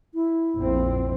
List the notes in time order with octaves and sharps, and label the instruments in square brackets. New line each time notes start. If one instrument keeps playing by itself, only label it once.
[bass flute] E4
[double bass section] A#1 F2 C4